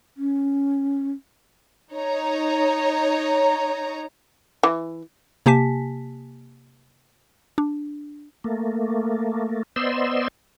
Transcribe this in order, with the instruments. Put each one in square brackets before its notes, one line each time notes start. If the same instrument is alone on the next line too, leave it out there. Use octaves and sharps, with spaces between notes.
[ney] C#4
[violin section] D#4 C#5 A#5
[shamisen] E3
[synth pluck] C3 A#3 G4 G#5 A5 B6
D4
[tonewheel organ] A3 A#3
B3 C5 D5 D#5 C6 E6